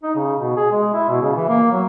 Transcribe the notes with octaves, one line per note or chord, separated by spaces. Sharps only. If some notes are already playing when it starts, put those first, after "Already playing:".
D#4
C#3
B2
G#4
G#3
E4
B2
C#3
E3
A#3
F#3